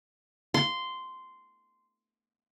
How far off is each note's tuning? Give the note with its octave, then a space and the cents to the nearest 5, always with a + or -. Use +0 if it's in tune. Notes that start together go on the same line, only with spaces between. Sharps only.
C6 -10